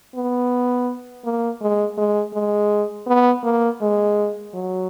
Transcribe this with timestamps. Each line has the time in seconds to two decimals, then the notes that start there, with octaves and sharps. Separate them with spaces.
0.15 B3
1.25 A#3
1.61 G#3
1.98 G#3
2.34 G#3
3.07 B3
3.44 A#3
3.81 G#3
4.54 F#3